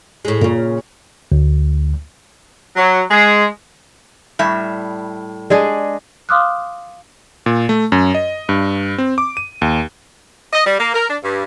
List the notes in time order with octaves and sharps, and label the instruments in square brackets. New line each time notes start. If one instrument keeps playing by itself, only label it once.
[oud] A2 G#3
[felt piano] A#2 [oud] C#3 A#4
[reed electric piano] D2
[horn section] F#3
G#3
[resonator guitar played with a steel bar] A2 G3 E5
[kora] G#3 D4 G#4
[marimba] F5 C6 D6 D#6 F6 F#6
[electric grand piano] A#2
A3
F#2
D#5
G2
C4
D6
D#7
D#2
[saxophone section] D#5
G3
A#3
A#4
D4
G2